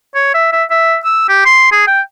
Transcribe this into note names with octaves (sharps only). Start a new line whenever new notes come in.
C#5
E5
E5
E5
E6
G4
C6
G#4
G5